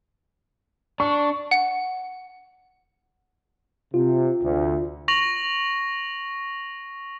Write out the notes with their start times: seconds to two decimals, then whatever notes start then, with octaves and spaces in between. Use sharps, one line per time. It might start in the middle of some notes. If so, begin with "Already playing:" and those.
1.00 D4 C#6
1.51 F#5
3.94 C3 F4
4.43 D2
5.08 C#6 A#6 F7 F#7